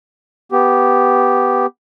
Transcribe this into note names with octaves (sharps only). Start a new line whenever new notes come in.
B3 G4